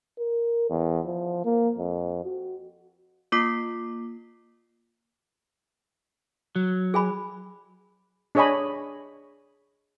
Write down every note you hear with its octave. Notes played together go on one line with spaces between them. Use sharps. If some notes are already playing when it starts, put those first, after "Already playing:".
A#4
E2
F3
A#3
F2
F#4
A#3 F4 D6 B6 C7
F#3
G#4 G#5 B5
D4 G#4 C#5 D#5 G#5 B5